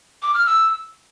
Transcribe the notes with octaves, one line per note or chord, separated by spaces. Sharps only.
D6
F6
E6